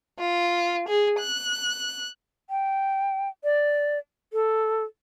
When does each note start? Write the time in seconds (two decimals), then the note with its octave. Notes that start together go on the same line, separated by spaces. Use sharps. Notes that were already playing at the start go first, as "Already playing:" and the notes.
0.19 F4
0.88 G#4
1.19 F#6
2.49 G5
3.44 D5
4.33 A4